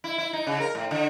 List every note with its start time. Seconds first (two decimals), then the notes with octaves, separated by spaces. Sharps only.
0.04 E4
0.18 E4
0.33 D#4
0.47 C#3
0.60 A#4
0.75 A2
0.91 D3